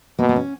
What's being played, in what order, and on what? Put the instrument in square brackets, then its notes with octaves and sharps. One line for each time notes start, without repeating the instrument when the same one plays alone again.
[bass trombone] B2 [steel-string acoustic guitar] A#3
[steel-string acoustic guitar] B3
C#4